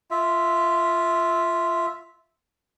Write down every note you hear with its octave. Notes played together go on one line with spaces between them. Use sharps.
F4 E5